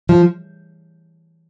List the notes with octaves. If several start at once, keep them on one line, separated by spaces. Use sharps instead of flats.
F3